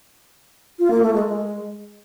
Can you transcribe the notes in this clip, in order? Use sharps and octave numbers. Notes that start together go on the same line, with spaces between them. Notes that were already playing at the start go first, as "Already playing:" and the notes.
F4
A#3
A3
G#3
G#3